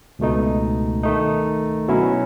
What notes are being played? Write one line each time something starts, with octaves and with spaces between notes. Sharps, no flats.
C#2 B2 A3 D#4
D#3 A3 D#4
B2 F#3 C#4 E4